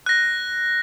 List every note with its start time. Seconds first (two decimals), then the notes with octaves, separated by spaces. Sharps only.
0.06 F#6 A#6